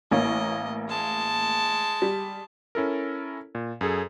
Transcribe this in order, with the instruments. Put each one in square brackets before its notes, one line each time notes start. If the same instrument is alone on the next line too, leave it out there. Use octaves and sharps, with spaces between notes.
[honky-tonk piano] A1 A#3 C#5 [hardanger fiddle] D#5
[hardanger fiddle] G#3 A5
[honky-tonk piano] G3
[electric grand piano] C#4 E4 A4 A#4
A#2
F#2 G#4 A4